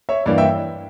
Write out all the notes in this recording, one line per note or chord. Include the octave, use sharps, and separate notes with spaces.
C#5 E5
G2 E3 A#3 D5 F5
E5 G5